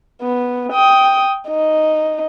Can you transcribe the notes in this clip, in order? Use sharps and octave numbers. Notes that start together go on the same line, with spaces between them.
B3
G5 D#6
D#4